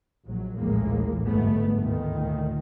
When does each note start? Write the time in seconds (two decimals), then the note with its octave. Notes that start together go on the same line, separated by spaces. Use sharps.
0.25 A#1 F#3
0.57 A#1 D#2 A2 E3 G#3 A#3
1.26 G1 G#2 A3 B3
1.82 D2 A#2 D#3